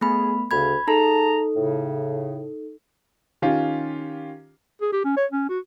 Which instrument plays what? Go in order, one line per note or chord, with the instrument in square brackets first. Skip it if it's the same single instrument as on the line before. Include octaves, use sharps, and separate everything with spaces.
[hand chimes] A3 B3 B5 [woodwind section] G#4
[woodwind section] D2 C#3 [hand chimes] B5 G#6
[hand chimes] D#4 A4 [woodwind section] G#4 A5 A#5
[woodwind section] A2 C#3
[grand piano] D#3 C#4 F4 G4
[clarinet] G#4
G4
C#4
C#5
C#4
F#4